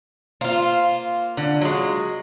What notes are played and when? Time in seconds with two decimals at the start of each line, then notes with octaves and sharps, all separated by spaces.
0.41 A#3 F4 C5
1.37 D3
1.61 F#3 G#3